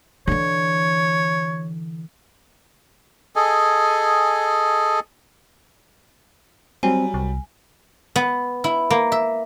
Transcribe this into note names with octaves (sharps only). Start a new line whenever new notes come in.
D3 E3 C#5
G#4 A4 D#5 G#5
F#3 G3 C4 G#5
C2
B3
E4
A#3
E5